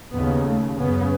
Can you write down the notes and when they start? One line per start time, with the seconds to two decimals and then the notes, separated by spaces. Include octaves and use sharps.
0.12 D#2 C#3 B3
0.44 A3
0.77 F#2 C#3 B3